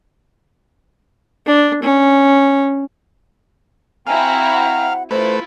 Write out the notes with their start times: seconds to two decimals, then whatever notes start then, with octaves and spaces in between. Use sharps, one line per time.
1.46 D4
1.83 C#4
4.07 C4 E4 F#4 E5 F5 G5 G#5 A#5
4.53 F#5
5.11 A3 E4 F4 B4 C5